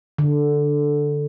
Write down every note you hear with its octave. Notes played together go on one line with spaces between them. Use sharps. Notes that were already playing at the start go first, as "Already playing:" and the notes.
D3